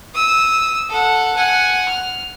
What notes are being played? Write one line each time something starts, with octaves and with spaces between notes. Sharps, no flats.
D#6 E6
A4 F#5
F#5 G#5
F6